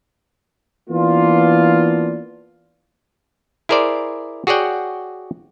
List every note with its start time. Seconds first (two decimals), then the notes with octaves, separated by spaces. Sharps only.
0.90 E3 A#3 B3 D4 F4
3.69 E4 G#4 A#4 C5 D5
4.47 F#4 G#4 C#5 D5 F#5 G5